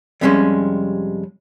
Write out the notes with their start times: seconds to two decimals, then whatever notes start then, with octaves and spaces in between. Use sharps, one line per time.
0.21 F2 C3 G3 G#3 B3 C#4